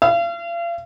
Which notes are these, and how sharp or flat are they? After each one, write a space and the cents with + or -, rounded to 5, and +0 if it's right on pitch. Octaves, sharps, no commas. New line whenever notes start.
F5 -40